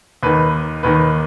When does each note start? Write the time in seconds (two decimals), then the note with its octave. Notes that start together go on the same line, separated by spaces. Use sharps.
0.23 D#2 D#3 B4
0.83 D#2 D#3 B4